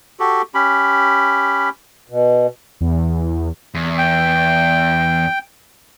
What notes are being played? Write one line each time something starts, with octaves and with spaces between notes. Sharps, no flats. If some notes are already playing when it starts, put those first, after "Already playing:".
F#4 G4 A4
C#4 G4 B5
B2
E2
E2
G5